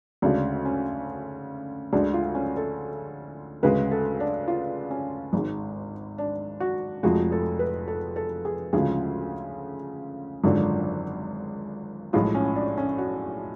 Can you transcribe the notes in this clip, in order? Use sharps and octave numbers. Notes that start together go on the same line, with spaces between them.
D2 C#3 G#3 D4
C#4
D2 D3 G#3 D4
F4
C#4
A4
D2 C#3 G#3 B4
A4
D4
F4
C#4
G#1 G#2 G#3
D4
F#4
F1 F2 F3 G#3 F#4
A4
B4
A4
A4
G#4
D2 C#3 F3 G#3 G#4
G#1 F#2 D3 F3 G#3
B1 A2 F3 G#3 F4
C#4
D4
C#4
F#4